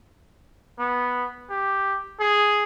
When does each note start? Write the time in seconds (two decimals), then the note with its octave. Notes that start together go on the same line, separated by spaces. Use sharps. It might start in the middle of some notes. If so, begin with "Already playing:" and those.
0.79 B3
1.50 G4
2.20 G#4